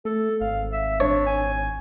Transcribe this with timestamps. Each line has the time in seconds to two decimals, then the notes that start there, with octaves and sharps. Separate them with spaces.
0.05 A3 A4
0.41 G#1 F5
0.72 E5
1.00 D4 C#5
1.26 G#5